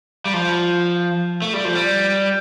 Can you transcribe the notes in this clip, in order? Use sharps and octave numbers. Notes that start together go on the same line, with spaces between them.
G3
F3
A3
G3
F3
G3